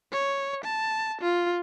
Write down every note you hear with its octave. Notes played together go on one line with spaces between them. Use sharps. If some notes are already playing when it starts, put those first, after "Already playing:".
C#5
A5
F4